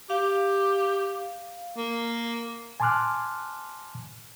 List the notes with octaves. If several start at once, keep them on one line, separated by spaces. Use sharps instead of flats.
G4 F5
A#3
G#5 A5 C6 D6 F6 F#6